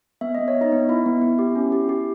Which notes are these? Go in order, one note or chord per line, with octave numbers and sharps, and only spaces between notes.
B3 E5
B3 D#5
C#5
B3
D#4 D#5
B3
B3 E4 E5
B3
B3
G4
C#4
G4
G4